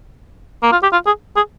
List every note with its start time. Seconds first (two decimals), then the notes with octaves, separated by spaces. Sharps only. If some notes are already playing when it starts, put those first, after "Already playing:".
0.63 A#3
0.72 F4
0.83 G4
0.92 F4
1.06 G#4
1.36 G#4